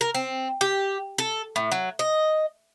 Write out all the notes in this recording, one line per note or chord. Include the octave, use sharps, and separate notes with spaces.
A#4
C4
G4
A4
A2
F#3
D#5